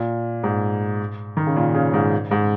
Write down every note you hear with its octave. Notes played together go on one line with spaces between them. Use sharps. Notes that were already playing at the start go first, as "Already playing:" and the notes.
Already playing: A#2
G#2
D#3
C#3
A#2
C#3
G#2
G#2